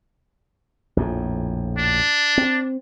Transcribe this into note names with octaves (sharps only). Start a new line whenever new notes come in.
A#1 F2 A2
D4
C4